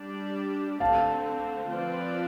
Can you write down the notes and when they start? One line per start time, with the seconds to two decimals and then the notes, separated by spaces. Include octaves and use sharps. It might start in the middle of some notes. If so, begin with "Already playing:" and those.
Already playing: G3 D4 G4 D5
0.80 D3 A3 C4 F5 A5
1.71 F3 C4 F4 B4 D5